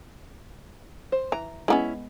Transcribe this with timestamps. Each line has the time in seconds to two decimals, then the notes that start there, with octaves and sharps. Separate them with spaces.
1.12 C5
1.32 E3 A#5
1.68 G#3 A#3 B3 C#4 E4